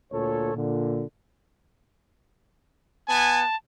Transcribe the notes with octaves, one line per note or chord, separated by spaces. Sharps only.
D2 A#2 A4 C#5
A#2 D3
B3 G#5 A5